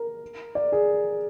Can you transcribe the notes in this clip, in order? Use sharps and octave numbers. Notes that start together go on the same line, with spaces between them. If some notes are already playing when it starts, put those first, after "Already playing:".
Already playing: A#4
D5
G#4